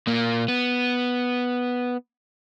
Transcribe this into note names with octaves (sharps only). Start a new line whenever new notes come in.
A#2 A#3
B3